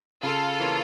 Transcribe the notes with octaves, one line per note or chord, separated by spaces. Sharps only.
C#3 F4 A4
E3 A#3 C#4